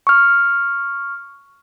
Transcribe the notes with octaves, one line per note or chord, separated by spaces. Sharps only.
C#6 F6